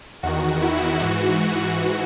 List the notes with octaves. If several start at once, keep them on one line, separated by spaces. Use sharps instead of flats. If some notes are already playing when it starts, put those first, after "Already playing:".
E2 D#3 F#4
E4
G#2 E3 F#4